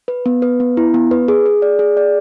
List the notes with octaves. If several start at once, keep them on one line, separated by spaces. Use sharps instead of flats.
B4
B3
B4
B3
E4
B3
B4
G#4
G#4
D5
G#4
D5